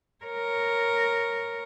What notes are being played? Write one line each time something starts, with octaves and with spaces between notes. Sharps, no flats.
A#4 C#5